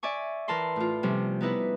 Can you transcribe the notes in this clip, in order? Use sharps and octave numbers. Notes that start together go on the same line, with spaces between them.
D5 E5 G#5 C#6
E3 A#4 A5 B5 C6
A2 F4
C3 F3 G3 C#4
B3 D#4 E4 B4